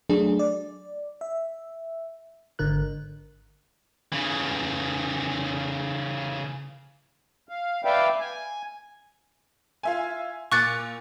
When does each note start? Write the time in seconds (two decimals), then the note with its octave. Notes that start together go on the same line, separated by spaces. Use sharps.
0.09 F#3 A3 D4 G#4
0.39 D5
1.21 E5
2.59 G#1 D3 A#4 F#6
4.12 C#3 E3
7.49 F5
7.85 B4 D5 E5 F5 G5
8.20 G#5
9.83 F4 E5 G#5
10.52 A#2 C#6 D6 F#6 A6 C#7